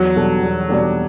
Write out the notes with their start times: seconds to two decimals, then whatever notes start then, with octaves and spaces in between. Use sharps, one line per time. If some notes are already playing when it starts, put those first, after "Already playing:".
Already playing: E2 F#3
0.16 B2 G3 D4 A4
0.42 E2
0.69 B2 G3 D4 A4